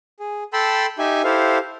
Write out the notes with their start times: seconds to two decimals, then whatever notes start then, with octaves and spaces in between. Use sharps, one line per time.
0.20 G#4
0.53 A4 G5 A5 B5 C6 E6
0.99 D#4 G4 E5 G#5
1.24 E4 G4 A4 C5 F5